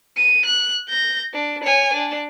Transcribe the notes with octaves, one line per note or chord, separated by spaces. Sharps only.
D#7
F#6
G6 A#6
D4
C#5 G#5
D4